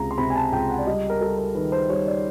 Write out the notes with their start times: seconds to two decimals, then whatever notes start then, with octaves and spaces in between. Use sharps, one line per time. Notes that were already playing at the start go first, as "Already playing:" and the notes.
Already playing: C#2 C3 A#5
0.11 C6
0.18 C3 B5
0.30 G#5
0.36 A5
0.52 C#2 G5
0.70 F#5
0.78 D5
0.87 G3 D#5
1.10 A#4
1.21 G3 A4
1.38 A#4
1.55 D#3 B4
1.72 C5
1.90 G3 C#5
2.07 D5